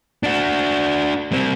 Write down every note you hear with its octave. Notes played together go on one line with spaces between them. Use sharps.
D4 F#4
G3 C4